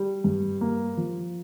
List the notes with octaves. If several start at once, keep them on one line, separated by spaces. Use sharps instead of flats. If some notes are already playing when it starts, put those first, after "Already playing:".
Already playing: G3
G2
A#3
F3